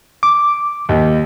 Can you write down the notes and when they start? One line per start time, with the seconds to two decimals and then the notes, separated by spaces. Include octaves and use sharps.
0.23 D6
0.89 D#2